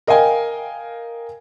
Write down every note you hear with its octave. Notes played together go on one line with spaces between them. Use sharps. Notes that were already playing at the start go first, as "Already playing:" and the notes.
A#4 D#5 F5 G5 G#5